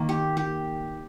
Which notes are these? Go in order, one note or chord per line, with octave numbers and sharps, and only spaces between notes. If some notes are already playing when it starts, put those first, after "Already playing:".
Already playing: D#3 A#3
G4
G4